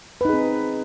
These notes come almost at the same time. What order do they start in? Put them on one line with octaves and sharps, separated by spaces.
B4 D#4 G#4 C4